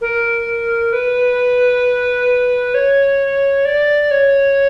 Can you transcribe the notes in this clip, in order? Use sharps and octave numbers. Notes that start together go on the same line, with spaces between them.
A#4
B4
C#5
D5
C#5